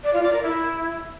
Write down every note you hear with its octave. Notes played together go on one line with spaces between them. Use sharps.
D5
F4
D5
A#4
E4